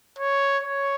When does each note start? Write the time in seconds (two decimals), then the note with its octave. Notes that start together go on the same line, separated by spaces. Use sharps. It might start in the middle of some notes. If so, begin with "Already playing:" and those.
0.19 C#5
0.63 C#5